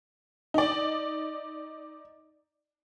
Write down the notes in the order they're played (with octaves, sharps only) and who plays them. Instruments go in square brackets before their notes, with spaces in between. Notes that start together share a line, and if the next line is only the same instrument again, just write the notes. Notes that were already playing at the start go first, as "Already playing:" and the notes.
[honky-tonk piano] D#4 D5